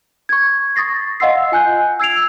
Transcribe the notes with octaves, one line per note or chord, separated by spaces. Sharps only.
C#6 G#6
C#6 D#6 A6 A#6 C7
D#5 F5 F#5 C6 E6 C7
F4 G#5 F#6 G6
E6 G#6 C7 D7 F7